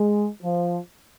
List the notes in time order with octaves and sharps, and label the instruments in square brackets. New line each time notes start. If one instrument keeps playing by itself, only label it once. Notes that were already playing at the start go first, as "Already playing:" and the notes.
Already playing: [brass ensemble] G#3
F3